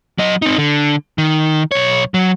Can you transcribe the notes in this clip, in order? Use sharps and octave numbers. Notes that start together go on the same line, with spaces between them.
F#3 D#5
C4 D#4
D3
D#3
B1 C#5
F#3